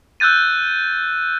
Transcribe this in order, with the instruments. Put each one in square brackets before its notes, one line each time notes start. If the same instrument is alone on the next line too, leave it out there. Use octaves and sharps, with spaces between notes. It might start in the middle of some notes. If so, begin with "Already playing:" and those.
[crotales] E6 F#6 G6 A6 D#7